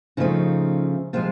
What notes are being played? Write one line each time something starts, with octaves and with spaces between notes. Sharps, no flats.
C#3 F3 A3 D#4
C3 F3 G#3 F4